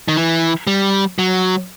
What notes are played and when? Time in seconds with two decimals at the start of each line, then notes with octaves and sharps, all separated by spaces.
0.08 D#3
0.16 E3
0.67 G3
1.19 F#3